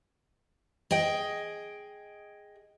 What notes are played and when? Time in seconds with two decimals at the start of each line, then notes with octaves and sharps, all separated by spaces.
0.91 G#4 D#5 G5